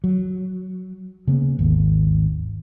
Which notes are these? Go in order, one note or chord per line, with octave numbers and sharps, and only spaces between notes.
F#3
C#3 A#3 B3
G#1 D#2